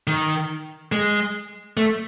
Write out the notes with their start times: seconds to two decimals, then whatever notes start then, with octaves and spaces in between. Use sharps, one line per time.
0.07 D#3
0.92 G#3
1.77 A3